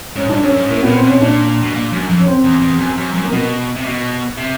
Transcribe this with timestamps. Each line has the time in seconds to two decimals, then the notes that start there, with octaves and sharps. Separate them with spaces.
0.16 G#2 C#4
0.29 G2 D4
0.43 F#2 C#4
0.56 G#2
0.68 A2 A#3
0.83 A#2 B3
0.96 C4
1.03 B2 C#4
1.21 A#2 D4
1.62 B2
1.75 A#2
1.92 F#2
2.09 F2
2.20 C#4
2.27 C4
2.44 E2
2.61 E2
2.79 F#2
2.98 F#2
3.14 F#2
3.24 A#3
3.32 B2 B3
3.76 C3
3.85 B2
4.37 C3